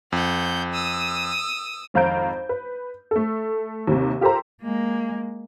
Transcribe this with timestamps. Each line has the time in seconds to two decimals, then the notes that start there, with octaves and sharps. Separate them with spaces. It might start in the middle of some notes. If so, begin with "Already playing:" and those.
0.12 F2 F#5 G6
0.73 D#6 E6
1.94 G#1 F2 F5 A#5 G6 D7
2.49 B4
3.11 A3 A4
3.87 D#2 C3
4.21 F4 G4 A4 A#4 C5 A#5
4.62 G#3 A#3